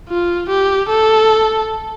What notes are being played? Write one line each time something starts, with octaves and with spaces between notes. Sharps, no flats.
F4
G4
A4